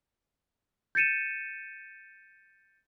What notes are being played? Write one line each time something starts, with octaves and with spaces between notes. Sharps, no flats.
G6 A6 C#7 D#7 E7